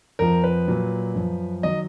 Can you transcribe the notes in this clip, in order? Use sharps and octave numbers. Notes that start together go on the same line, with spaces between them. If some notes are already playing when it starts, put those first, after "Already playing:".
F2 F3 A#4
B4
A#2 F#3
F#2 F3
D#3 F#3 D#5